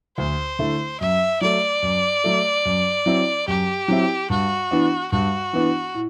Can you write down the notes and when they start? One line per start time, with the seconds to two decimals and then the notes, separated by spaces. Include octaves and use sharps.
0.18 D2 C5
0.59 D3 A3 E4
1.00 F#2 E5
1.41 F#3 A3 D5
1.82 F#2
2.24 F#3 A3
2.65 F#2
3.06 F#3 C4 E4
3.47 F#2 G4
3.88 F#3 C4 E4
4.30 G2 F#4
4.71 E3 B3 D4
5.12 G2 F#4
5.53 E3 B3 D4
5.94 A2